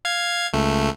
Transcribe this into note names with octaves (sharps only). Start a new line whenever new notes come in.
F5 G#6
C#2 A3